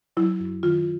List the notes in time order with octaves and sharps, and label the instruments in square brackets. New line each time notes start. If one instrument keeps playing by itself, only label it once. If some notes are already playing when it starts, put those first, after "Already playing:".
[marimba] F#3 E4
F#2
D#3 F4